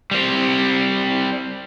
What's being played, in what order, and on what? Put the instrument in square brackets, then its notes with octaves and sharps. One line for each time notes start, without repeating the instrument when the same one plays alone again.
[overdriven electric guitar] G3 C4